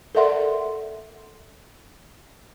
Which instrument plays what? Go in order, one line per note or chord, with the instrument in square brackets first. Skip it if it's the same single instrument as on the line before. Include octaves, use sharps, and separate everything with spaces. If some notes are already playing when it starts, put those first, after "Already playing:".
[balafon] A4 A#4 D5 E5 F#5 C6